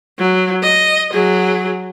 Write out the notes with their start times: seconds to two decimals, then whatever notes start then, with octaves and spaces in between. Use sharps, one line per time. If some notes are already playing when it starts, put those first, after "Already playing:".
0.19 F#3
0.63 D#5
1.13 F#3 G#4